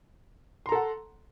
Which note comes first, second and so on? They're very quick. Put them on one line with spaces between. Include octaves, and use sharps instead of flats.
C6 A#5 A4 F#5